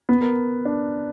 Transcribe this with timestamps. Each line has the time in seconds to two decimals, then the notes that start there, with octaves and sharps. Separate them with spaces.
0.09 B3
0.21 A#4
0.65 D4